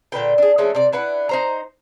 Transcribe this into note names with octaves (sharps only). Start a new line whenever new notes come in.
A#2 D3 B4 G5
D4 G#4
E3 G#3 A3 C#4
C3 D5
D4 E4 B4 F#5
D#4 C5 A#5